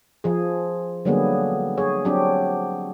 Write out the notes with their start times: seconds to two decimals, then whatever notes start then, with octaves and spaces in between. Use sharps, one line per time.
0.24 F3 G#4
1.05 D3 F#3 G3 A#3 B3 G#4
1.78 G#4 C#5
2.05 F#3 C4 D4 G4